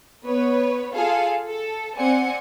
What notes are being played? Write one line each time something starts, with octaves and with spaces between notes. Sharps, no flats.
B3 B4 C#5
F4 G#4 A4 F5
A4
C4 D5 F#5 G#5 C#7